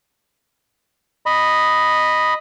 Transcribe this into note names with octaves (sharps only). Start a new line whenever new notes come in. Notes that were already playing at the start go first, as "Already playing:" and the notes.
D#5 B5